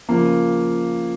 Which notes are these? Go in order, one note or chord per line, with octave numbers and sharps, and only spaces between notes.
C#3 F3 A#3